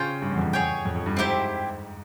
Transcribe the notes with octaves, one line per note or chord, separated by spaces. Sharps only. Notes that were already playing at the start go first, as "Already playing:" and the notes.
Already playing: C#3 C#4 F4 C5 G5
G2
E2
F2
E2 G#4 C#5 G5
F2
F2
G2
G#2 C4 E4 G4 C5